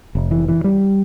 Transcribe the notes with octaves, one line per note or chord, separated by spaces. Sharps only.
F1
E3
E3
G3